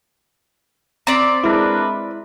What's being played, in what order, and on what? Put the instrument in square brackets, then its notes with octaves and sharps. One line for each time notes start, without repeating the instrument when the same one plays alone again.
[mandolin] C4 D5 [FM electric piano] A#5 A6 B6
[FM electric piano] G#3 E4 [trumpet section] D4 A#4 B4